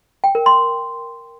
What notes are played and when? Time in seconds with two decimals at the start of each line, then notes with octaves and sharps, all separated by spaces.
0.24 G5
0.35 A#4
0.46 C6